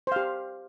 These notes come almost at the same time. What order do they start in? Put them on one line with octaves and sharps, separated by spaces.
C5 F5 G4